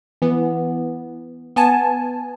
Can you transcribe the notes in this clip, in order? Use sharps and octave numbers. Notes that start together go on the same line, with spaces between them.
E3 B3
B3 G#5 A5